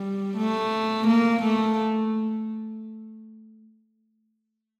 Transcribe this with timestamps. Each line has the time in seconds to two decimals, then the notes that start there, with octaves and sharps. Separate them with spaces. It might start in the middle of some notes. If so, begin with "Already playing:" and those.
Already playing: G3
0.37 A3
1.07 A#3
1.42 A3